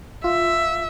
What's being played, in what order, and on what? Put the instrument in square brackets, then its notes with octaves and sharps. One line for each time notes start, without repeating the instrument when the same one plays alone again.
[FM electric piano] F4 [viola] E5